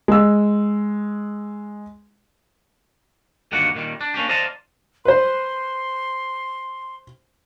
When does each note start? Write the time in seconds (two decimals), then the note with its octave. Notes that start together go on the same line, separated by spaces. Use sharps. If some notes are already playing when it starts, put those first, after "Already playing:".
0.08 G#3 E6
3.52 D2 G2 D#3 G3 A#3 F#5
3.74 A#2 D#3 G3
4.01 D4
4.14 A#3 C#4 D4 G4
4.29 C5 D5 D#5 F5 A5 A#5
5.05 B4 C5 C6